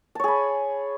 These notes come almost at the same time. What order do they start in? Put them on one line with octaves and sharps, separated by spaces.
A5 C#5 G#4 B5